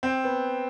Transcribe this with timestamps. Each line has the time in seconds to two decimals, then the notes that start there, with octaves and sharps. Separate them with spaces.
0.03 C4
0.24 B3